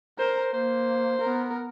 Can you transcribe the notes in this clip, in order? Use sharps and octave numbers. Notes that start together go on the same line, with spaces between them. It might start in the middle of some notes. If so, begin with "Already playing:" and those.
A#4 C5
A#3 C5
B3 A#4